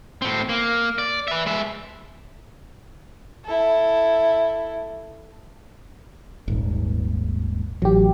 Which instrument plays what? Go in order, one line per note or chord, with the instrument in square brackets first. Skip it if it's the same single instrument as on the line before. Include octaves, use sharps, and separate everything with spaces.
[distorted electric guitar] A2 C4
A#3
D5
B4 E5
G#3 E5
[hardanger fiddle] E4 A4
[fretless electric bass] D#1 G#1
[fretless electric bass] A1 [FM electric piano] F#3 G4